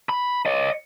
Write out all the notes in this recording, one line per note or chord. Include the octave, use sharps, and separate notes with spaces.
B5
C#5 D#5